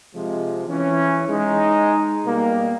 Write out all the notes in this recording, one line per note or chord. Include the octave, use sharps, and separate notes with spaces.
C3 F3 G#3
E3 C#4
G#3 D#4
B2 G3 A#3